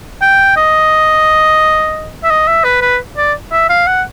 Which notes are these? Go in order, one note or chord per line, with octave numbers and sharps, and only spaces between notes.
G5
D#5
E5
D#5
E5
B4
B4
D5
E5
F5
F#5